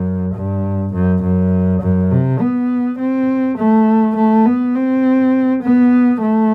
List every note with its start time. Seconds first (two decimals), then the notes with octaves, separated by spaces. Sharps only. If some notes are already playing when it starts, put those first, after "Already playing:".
Already playing: F#2
0.35 G2
0.93 F#2
1.23 F#2
1.82 F#2
2.11 C3
2.40 B3
2.99 C4
3.58 A3
4.16 A3
4.46 B3
4.75 C4
5.63 B3
6.22 A3